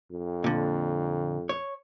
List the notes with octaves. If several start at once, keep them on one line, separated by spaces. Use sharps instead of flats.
F2
A#2 D3
C#5